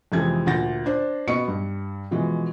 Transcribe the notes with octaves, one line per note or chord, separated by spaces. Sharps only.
F2 C3 E3 G#3 A4 G#6
D2 A#2 F#5 G6 A6 A#6
D4 C5
B2 B3 D#5 C#6 C#7
G2
B2 E3 F3 G#3